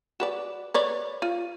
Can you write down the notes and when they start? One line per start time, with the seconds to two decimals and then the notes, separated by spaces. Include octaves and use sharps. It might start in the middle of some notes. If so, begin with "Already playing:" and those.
0.20 F#4 B4 D5
0.74 B4 C#5 D5
1.22 F4